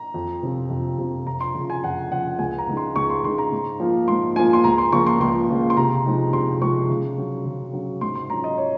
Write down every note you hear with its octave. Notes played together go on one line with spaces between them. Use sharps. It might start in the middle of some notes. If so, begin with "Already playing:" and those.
Already playing: A#5
F2
C3 F3 C4 F4
F2
C3 F3 C4 F4
F2 A#5
C6
C#3 F3
G#5
F2 F#5
C#3 F3 F#5
C#2 G#5
A#5
C#3 G#3 D#4
C6
C#2 C#6
C6
C#3 G#3 D#4 C6
A#5
G#2
F3 A#3 F4
G#2 C6
F3 A#3 F4 G#5
C6
C#2 A#5
C6
C#3 F3 A#3 F4 C#6
C6
C#2 C6
C#3 F3 A#3 F4
C6
C3 A#5
F3 G#3 D#4
C3 C6
F3 G#3 D#4 C#6
C#3
F#3 C#4
C#3
F#3 C#4
G#2 C6
C6
F#3 C#4 F4 A#5
D#5
C#5